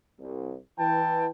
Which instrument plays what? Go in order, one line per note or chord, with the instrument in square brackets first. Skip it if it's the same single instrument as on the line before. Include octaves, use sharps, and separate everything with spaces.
[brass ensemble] C2
[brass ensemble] E3 B4 G5 [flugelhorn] A5